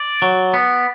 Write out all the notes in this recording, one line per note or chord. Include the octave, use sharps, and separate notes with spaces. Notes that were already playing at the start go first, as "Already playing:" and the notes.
Already playing: D5
F#3
B3